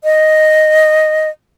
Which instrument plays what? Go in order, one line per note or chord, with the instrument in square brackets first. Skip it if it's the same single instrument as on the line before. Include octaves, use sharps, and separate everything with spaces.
[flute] D#5